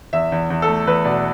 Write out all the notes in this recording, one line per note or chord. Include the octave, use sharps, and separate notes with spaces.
E2 E5
E2
E2
A4
A3
E2 B4
B2 D5